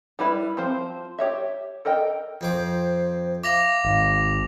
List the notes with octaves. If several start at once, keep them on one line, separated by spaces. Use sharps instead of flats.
G3 E4 B4 E5
F3 C4 C5
G4 C#5 E5
A4 A#4 D#5 G5
F2 C4 C5 D6
E5 F5 D6 A#6 F7
G#1